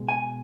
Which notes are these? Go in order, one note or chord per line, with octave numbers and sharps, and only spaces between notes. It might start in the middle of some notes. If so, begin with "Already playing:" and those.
Already playing: B2 G#3
G#5